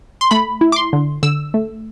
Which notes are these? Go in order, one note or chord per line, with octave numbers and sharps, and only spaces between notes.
C6
A3 B5
E4
D6
C6
D3
D3 E6
A3